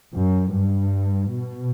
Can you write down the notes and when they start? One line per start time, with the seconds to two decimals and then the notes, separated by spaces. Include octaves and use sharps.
0.14 F#2
0.54 G2
1.32 B2